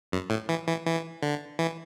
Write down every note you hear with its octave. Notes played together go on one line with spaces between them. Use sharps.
F#2
A2
E3
E3
E3
D3
E3